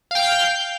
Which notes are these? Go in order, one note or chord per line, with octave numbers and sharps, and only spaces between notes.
F5 G5 F6 G6